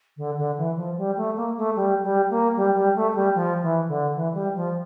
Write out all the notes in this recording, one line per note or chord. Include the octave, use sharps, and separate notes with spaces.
D3
D3
E3
F3
G3
A3
A#3
A3
G3
G3
A#3
G3
G3
A3
A3
G3
F3
E3
D3
E3
G3
F3